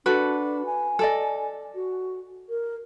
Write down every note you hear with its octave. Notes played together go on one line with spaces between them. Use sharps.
D4 F#4 A4 B4
G#5
A4 D5 D#5
F#4
A#4